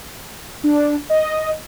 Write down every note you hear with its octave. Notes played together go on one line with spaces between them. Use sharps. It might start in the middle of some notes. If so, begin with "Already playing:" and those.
D4
D#5